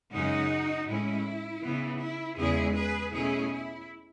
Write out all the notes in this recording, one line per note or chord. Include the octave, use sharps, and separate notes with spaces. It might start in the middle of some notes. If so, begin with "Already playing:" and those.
F#2 C#3 G#3 C#4 D#4 F#4
A2 G#3 C#4 E4
C#3 E3 B3
E4
E2 C#3 G#3 E4 G#4
G#4 B4
B2 A3 C#4 E4 G#4
E4